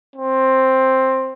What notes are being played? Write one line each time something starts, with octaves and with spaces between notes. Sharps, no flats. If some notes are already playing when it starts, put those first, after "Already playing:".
C4